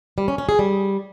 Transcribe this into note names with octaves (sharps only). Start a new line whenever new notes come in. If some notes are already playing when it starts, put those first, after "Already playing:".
G3
C#4
C#4
G#4
G3